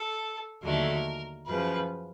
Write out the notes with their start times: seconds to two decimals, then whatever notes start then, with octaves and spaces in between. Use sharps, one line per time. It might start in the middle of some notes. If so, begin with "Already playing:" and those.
Already playing: A4
0.62 D#2 D3 F#3 A3 A#4
1.46 F#2 C#3 F3 B4